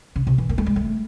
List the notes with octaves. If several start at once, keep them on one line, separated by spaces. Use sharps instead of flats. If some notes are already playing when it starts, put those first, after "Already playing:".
C#3
C3
E3
A#3
A3
G#3
A3